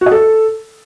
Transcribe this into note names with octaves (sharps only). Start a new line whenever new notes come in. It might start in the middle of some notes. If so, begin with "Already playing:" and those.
F#4
D#5
A4